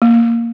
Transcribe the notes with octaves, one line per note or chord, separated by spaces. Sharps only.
A#3